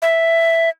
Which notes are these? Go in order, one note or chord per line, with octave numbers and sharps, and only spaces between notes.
E5